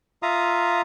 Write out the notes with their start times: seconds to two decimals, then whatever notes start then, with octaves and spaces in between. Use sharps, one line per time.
0.23 F4 E5 F5 A#5 D#6